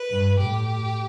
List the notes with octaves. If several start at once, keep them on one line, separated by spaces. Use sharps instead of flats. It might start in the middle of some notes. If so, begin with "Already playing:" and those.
Already playing: B4
G2
A2 G4